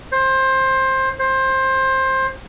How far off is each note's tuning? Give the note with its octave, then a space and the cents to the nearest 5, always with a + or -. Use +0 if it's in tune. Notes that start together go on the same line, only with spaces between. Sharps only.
C5 +20
C5 +20